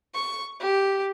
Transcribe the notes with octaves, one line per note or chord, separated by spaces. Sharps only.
C#6
G4